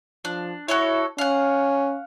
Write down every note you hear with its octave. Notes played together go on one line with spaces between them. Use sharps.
F3 D4
E4 F#4 A4 C#5
C#4 F5 F#5